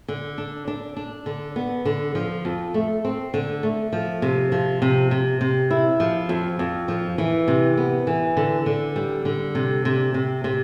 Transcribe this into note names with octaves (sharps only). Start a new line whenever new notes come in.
D3
D4
D4
D4
D3
B3
D3
F3
F2
A3
C4
D3
A3
F3
C3
F3
C3
C3
C3
E4
F3
F2
F2
F3
E3
C3
B3
E3
D3
D3
G3
D3
C3
C3
C3
C3